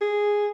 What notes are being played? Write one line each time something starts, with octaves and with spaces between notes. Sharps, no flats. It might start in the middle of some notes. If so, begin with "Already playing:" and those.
G#4